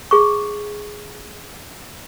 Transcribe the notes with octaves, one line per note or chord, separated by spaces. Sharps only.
G#4 C#6